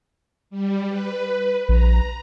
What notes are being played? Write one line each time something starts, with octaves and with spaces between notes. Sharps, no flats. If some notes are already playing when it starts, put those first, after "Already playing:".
G3
B4
A#1 A#5